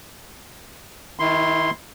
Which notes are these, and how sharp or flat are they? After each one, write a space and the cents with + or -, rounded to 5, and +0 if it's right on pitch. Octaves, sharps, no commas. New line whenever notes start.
D#3 +25 E4 -10 C6 +0